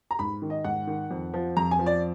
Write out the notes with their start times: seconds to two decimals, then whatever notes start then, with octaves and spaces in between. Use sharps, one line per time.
0.11 A#5
0.19 G#2 B5
0.42 D#3
0.50 D#5
0.64 G#2 F#5
0.87 D#3
1.11 F2
1.34 F3
1.57 F2 A#5
1.71 G#5
1.79 F3
1.86 D5